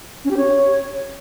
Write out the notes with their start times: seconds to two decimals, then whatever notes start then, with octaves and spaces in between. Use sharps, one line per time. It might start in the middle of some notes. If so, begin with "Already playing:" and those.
0.25 C#4
0.31 G4
0.37 C#5